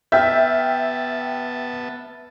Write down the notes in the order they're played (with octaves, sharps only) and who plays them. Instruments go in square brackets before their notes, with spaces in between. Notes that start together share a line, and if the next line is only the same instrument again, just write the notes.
[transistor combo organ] B3 A5 [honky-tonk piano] E5 [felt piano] G5 F6 G6